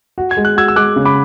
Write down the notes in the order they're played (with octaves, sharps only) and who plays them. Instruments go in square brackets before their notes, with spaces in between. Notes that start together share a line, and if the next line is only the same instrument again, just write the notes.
[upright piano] F#4
[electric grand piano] G#6
[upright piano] G#3
[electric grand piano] F#6
[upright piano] F#4 [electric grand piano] E6 G#6
[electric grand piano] E6
[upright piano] G#3 [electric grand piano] D6 F#6
[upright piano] C#3
[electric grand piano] B5 D6